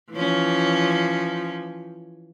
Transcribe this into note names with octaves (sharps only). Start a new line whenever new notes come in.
E3 F3 C#4